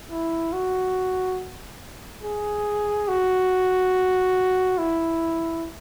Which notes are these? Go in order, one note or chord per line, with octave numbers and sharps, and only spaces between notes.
E4
F#4
G#4
F#4
E4